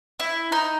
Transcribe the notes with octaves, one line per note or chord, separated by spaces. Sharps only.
E4
D#4